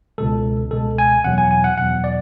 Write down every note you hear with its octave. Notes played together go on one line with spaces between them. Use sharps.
C#2 B2 G#3 A4
C#2 B2 G#3 A4
G#5
E2 B2 F#3 F#5
G#5
G#5
F#5
E2 B2 F#3 F#5
D5